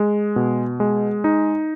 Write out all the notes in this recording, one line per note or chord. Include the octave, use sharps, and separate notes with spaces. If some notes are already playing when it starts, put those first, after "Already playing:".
Already playing: G#3
B2
G#3
D#4